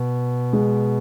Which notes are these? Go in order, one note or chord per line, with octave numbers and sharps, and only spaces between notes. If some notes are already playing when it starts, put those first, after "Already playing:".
Already playing: B2
G#3